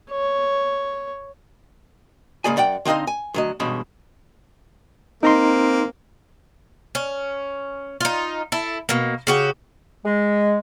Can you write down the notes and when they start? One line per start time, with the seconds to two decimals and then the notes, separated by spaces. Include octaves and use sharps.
0.11 C#5
2.44 G#2 C#3 A#3 G#4 D5 G#5
2.57 F#2 D5 F#5 G5
2.85 D3 C4 D#4 D#5 F5
3.07 G#5
3.34 D2 F#3 D#5
3.60 E2 G2 B2 G#3 C#4
5.23 A#3 C4 D#4 A#5 C6
6.95 C#4
8.01 D#4 F4
8.52 E4 A4
8.89 B2 A#3
9.27 C#3 F#4 G4
10.05 G#3